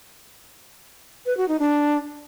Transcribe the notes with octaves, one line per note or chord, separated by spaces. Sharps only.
B4
F#4
D#4
D4